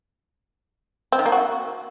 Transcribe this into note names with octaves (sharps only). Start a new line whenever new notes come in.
C4
D#3
A#3
F#4